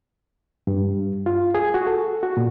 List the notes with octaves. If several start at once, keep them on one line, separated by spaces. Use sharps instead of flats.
G2
F4
G#4
F#4
A4
F#4
A#2